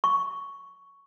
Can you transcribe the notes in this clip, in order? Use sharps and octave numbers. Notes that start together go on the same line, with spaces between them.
C#6